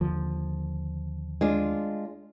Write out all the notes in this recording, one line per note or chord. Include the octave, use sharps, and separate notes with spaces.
D#2 D3 F3
G#3 D4 F4